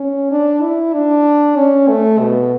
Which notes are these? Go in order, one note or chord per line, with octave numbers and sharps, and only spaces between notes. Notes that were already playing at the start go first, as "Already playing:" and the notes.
Already playing: C#4
D4
E4
D4
C#4
A3
B2